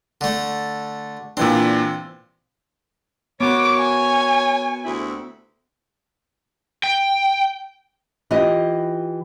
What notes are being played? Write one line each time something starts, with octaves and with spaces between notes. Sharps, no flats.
D3 A3
A#2 E3 C4 D4
B3 F#4 A#4 C#5 D6
G#5
D2 C3 E4
G5
E3 F4 G4 D#5